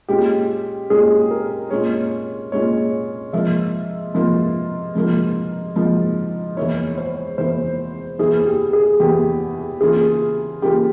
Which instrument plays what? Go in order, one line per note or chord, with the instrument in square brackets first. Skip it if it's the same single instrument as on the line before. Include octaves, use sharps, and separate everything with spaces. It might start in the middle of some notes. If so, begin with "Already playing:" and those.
[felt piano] A#2 G#3 C#4 F4 [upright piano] G4
[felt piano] A#2 G#3 C#4 F4 [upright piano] G#4
[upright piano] A#4
[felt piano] A#2 G#3 C#4 F4 [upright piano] C#5
[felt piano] A#2 G#3 C#4 F4 [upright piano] C#5
[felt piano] G#2 F3 A#3 F4 [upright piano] E5
[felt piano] G#2 F3 A#3 F4
G#2 F3 A#3 F4
G#2 F3 A#3 F4
[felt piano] E2 E3 A#3 E4 [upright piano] C#5
[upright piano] C5
[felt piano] E2 E3 A#3 E4 [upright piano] C5
[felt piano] E2 E3 A#3 E4 [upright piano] G#4
[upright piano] G4
G#4
[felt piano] E2 E3 A#3 E4 [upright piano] G4
[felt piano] C#3 E3 A#3 F4 [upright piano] G#4
[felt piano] C#3 E3 A#3 F4 [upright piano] G4